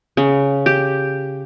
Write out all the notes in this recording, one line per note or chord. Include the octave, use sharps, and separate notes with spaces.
C#3
G4